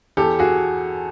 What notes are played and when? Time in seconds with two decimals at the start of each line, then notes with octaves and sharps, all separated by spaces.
0.17 E2 G4 A4
0.39 F#4 G#4